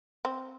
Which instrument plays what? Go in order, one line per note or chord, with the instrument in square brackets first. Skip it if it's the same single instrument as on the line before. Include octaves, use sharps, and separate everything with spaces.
[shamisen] C4